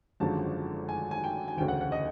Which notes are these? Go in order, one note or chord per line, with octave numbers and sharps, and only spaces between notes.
G#1 F#2 D3 F3 G#3 A5
G#5
G#5
G5
G#5
E1 D2 C#3 G5
F#5
F#5
D#5